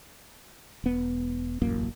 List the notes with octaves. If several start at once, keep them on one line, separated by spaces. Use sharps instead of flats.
E1 B3
E1 A1 F#2 A#3